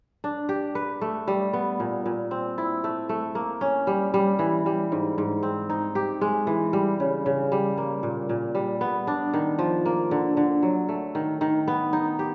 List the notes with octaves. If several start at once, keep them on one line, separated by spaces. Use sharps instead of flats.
D4
G4
B4
A3
G3
B3
A#2
A#2
C4
E4
A3
A3
A#3
C#4
G3
G3
E3
G3
G#2
G#2
C4
D#4
G4
G#3
E3
G3
C#3
C#3
G3
A#3
A#2
A#2
G3
B3
D4
D#3
F3
A#3
D3
D3
F#3
A3
D#3
D#3
B3
D#4
G4